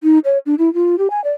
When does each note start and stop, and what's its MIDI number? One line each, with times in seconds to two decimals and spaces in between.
0.03 0.19 63
0.24 0.38 73
0.46 0.55 62
0.58 0.73 64
0.74 0.98 65
0.98 1.08 67
1.10 1.23 80
1.24 1.32 74